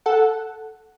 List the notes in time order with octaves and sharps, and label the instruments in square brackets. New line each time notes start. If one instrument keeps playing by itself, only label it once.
[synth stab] A4 F#5